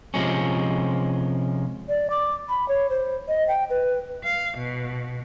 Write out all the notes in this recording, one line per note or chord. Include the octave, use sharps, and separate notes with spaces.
C3 F3 G#3 C#4
D5
D6
B5
C#5
C5
D#5
G5
B4
F5
B2